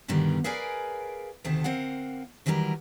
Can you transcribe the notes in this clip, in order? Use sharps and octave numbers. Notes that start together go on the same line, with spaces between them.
G2 B2 D3 D#3 G3
G#4 A#4 B4 D5 F5 G#5
D2 C3 D#3 A3 A4 A5
C4 A#4 F5 F#5
D#3 E3 F#3 G3 G4 A#4